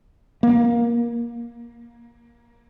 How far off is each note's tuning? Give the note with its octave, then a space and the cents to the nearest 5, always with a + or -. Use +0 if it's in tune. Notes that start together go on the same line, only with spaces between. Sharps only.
A#3 +20